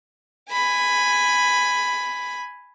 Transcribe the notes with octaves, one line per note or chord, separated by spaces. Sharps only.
G#5 B5